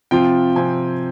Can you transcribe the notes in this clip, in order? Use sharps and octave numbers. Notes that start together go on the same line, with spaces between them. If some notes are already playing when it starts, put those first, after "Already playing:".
C3 F3 C4 F4 G5
C3 F3 C4 F4 G#5